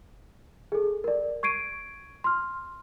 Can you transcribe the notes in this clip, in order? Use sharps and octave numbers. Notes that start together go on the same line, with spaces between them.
G#4 A4
A#4 D5
C#6 G#6 C7 D7 D#7
C6 F6